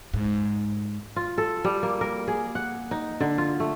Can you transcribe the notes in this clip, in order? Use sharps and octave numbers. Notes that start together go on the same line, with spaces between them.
G#2
F4
A4
G3
A#3
A#4
G#4
F#5
D#4
D3
F4
A3